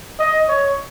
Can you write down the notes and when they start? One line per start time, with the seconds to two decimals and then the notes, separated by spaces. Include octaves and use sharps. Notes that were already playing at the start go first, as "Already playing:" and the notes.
0.19 D#5
0.48 C#5